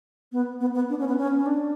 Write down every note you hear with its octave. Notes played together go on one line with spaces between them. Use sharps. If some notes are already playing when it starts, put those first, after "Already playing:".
B3
B3
B3
D4
C#4
B3
C#4
C#4
D4